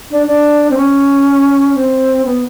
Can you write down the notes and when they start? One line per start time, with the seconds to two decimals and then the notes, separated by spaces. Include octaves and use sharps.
0.10 D4
0.27 D4
0.70 C4
0.76 C#4
1.75 C4
2.24 B3